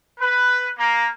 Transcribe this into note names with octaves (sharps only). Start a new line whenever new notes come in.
B4
A#3